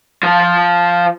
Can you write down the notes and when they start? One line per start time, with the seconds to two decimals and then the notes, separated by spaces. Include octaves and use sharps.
0.23 F3 F4